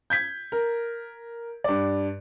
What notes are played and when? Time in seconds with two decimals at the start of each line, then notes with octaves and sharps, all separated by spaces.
0.10 G6 G#6 B6
0.52 A#4
1.64 G2 D5